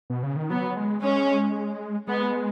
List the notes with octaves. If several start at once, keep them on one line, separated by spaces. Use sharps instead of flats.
B2
C#3
D#3
F#3 B3
G#3
G#3 C#4
G#3 B3